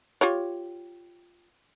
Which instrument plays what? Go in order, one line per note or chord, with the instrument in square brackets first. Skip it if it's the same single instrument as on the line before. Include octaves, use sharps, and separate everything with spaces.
[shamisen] F4 G4 C#5